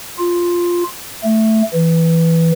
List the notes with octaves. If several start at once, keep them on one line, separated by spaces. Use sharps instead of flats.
F4
A3
E3